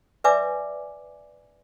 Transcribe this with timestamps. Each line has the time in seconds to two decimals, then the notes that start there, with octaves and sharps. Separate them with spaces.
0.24 B4 D5 E5 G#5 D6